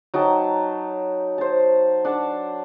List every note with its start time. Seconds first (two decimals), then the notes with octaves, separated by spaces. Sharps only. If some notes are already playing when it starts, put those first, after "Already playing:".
0.14 F#3 D#4 G5 A5
1.38 C5 A5
2.05 D4 F#5 A5